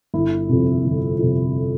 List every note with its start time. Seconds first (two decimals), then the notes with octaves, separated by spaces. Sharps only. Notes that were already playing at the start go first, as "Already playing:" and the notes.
0.14 G1 E4
0.49 F2 C3
0.84 G1
1.19 F2 C3